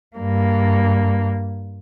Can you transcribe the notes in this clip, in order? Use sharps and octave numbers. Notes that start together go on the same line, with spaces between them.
G2 A#3